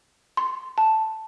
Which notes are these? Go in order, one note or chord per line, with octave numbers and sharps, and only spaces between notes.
C6
A5